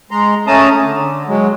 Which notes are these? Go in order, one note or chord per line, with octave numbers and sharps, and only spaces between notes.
G#3 A#5 C6
A3 C#4 A5 A#5 D#6
D3
F#3 G#3